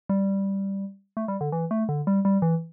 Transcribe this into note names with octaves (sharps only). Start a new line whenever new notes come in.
G3
A3
G3
D3
E3
A3
D3
G3
G3
E3